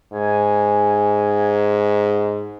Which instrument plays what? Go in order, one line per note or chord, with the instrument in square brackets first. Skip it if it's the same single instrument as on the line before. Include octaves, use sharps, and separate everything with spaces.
[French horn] G#2 [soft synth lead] G#5